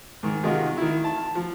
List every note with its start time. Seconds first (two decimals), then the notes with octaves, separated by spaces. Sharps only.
0.23 G#2 D#3
0.43 C3 D#3 G#3 D#4 F4 F#4
0.77 D#3 E4
1.04 A5
1.35 F3